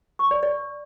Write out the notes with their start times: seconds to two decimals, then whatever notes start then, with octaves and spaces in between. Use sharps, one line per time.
0.19 C#6
0.31 D5
0.43 D5